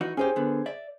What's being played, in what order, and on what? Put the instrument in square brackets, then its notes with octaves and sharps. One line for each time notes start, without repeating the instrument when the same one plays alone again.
[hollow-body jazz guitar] E3 D#4 F#4
[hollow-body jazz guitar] C#4 D#4 G4 [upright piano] G#4 C5
[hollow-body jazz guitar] D3 B3
D5 E5